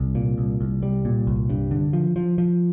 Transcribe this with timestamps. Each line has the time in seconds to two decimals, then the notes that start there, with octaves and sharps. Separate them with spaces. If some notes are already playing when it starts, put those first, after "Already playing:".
Already playing: C2
0.15 A#2
0.38 C2
0.61 C2
0.83 G3
1.05 A#2
1.27 C2
1.49 G2
1.71 D3
1.93 F3
2.16 F3
2.38 F3